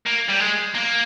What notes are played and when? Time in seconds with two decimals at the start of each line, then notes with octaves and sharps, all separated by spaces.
0.06 A#3
0.29 G3
0.40 G#3
0.75 A#3